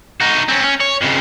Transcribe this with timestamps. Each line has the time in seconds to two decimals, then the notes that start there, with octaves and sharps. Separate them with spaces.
0.21 D#4 F#4
0.48 C4 C#4
0.62 C#4
0.80 C#5
1.02 F2 C#3